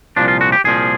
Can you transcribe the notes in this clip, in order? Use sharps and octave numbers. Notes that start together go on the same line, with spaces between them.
C2 A#2 F3 D4
F4
F#4
G4
C2 A#2 F3 G#4